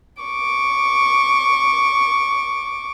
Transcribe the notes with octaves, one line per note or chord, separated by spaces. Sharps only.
C#6 D6